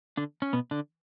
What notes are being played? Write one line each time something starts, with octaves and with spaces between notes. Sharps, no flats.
D3 D4
C#4
B2 B3
D3 D4